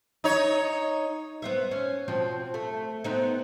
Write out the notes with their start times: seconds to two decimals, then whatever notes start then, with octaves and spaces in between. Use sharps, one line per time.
0.24 D#4 C#5
1.42 B3 C5 E5
1.71 C#4
2.08 B2 F3 C4
2.54 A3
3.04 B3 C4 D#4